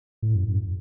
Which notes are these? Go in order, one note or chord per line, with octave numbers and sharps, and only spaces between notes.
A2
F#2
F#2